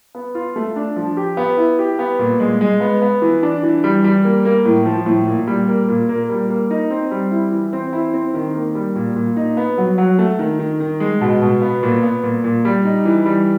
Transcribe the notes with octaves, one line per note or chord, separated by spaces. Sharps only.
B3
F4
A3
D4
F3
G4
B3
E4
G4
B3
A#2
G#3
G#3
B3
B3
E3
D4
E3
G3
G3
A#3
A#3
A2
F3
A2
A#2
G3
A#3
A#2
A#3
G3
A#3
D#4
C4
G3
E4
E3
C4
E4
C4
D#3
A#3
G3
A#2
A#2
D#4
B3
F#3
F#3
A3
D#3
D#3
D#3
G#3
B2
B2
B3
A#2
B3
A#2
A#2
G3
D#4
E3
G3